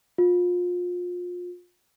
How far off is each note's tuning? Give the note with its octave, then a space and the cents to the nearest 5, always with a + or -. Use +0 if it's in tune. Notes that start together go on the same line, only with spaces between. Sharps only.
F4 +30